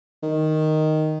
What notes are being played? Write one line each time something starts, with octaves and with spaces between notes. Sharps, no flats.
D#3